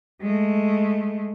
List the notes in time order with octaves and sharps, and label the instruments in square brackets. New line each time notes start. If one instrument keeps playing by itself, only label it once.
[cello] G#3 A3